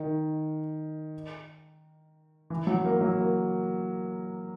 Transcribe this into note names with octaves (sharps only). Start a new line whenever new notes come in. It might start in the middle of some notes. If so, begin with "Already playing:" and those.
Already playing: D#3
E3
F#3
A#3
F#3
A#3